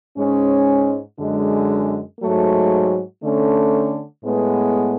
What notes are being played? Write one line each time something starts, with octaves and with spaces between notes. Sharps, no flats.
G#2 G#3 C#4
F#2 D3 G#3
G#2 F#3 A3
D3 A3 C#4
A2 G#3 B3